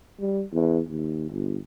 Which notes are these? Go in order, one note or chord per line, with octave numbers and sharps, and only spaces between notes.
G3
E2
D#2
G1